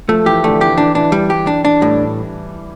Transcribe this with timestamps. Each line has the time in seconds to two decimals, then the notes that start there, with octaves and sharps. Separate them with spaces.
0.08 F3 A3
0.26 E3 G4
0.43 D3 A3
0.61 E3 G4
0.78 E3 D4
0.95 E3 D4
1.12 G3
1.30 G4
1.47 D4
1.65 D4
1.81 A2 G3